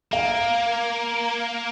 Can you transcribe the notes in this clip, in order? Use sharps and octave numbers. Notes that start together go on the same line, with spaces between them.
A#3 F5